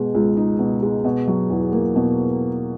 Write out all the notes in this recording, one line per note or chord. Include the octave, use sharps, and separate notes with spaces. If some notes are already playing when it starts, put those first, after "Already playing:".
Already playing: B2 G#3
C#2
D#4
B2
G#3
B2
F#3
E2
A#3
B2